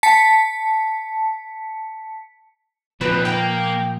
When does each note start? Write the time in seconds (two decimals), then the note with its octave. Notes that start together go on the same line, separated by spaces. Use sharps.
0.03 A5 B6 C#7
3.01 A#2 F3 C4 D#4 B4
3.25 A#3 A#4 G5